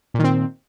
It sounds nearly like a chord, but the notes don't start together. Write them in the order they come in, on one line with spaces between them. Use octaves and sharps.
A#2 D#3 C4